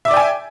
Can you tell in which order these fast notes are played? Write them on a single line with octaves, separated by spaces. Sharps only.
E5 D6 D5 G5 G#5